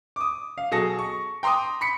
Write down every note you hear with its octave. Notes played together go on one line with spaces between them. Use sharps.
D6 D#6
F5
B2 F#3 G#4 A4 D#6 A#6
C#6
G5 A#5 C6 D6 D#6
B5 B6 C#7